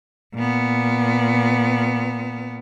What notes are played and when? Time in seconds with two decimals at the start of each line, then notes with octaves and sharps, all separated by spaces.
0.34 A#2 B3